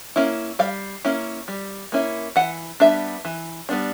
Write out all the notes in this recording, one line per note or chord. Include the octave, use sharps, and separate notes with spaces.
A#3 C#4 E4
G3 F5
A#3 C#4 E4
G3
A#3 C#4 E4
E3 F#5
G3 B3 D4 E5
E3
G3 B3 D4